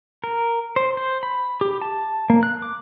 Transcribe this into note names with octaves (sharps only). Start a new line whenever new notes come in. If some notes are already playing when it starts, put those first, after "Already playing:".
A#4
C5
C5
B5
G4
A5
A#3
F#6
D6